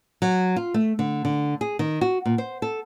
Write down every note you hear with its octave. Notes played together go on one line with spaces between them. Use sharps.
F#3
F4
A3
D3
D3
G#4
D#3
F#4
A#2
C5
A4